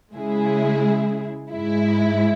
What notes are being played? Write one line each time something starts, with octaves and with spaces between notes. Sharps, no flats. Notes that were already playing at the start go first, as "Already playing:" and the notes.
C#3 G#3 E4 G#4
G#2 G#3 E4